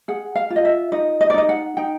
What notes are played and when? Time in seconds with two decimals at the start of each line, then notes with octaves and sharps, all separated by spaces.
0.08 G#4 F#5
0.36 F5
0.50 F4
0.56 D#5
0.65 E5
0.92 D#4 D#5
1.21 D#5
1.30 D5
1.34 D#4 D#5
1.49 F#5
1.77 D#4 G5